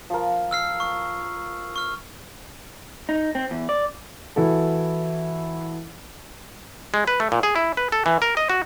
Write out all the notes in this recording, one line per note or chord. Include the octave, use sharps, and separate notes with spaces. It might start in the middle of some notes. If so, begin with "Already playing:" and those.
F3 A#4
E6 F6 C7
C#6
C#6 F6
D#4
C4
E2
D5
E3 E4 F#4 A4
G#3
B4
A3
A#2
G#4
E4
B4
A4
E3
A#4
D#5
F#4